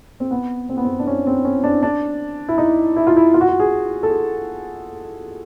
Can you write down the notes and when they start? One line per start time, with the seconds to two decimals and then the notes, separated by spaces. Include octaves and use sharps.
0.20 C4
0.31 B3
0.69 C4
0.77 B3
0.84 C4
0.99 D4
1.07 C#4
1.27 C4
1.45 C#4
1.64 D4
1.83 D4
2.48 E4
2.58 D#4
2.96 E4
3.07 F4
3.17 E4
3.34 F4
3.41 F#4
3.48 F4
3.60 G#4
4.03 A4
4.10 G#4